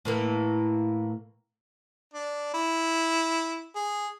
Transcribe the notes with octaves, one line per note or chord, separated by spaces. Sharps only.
A2 E3 A#3
D4
E4
G#4